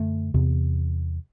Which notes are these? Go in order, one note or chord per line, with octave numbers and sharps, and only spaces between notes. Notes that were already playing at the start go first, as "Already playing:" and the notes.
Already playing: F#2 D3 A3
E2 C3